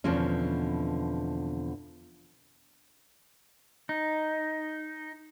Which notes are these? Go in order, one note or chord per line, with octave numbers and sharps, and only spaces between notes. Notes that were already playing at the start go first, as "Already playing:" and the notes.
E2 B2 D3 F3 C4 C#4
D#4